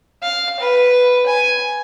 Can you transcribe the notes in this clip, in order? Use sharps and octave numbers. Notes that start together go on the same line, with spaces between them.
F5
B4
G#5